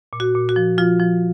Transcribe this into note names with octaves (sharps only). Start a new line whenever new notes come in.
A#2
F#4
A#2
F#4
F3
F3 F4
F3